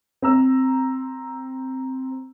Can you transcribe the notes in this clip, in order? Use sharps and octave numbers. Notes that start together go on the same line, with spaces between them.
C4 A#5 E6